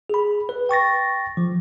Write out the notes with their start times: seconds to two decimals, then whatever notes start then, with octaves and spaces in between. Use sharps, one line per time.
0.10 G#4 B5
0.49 B4
0.69 G5 C#6 A6 A#6
1.37 F3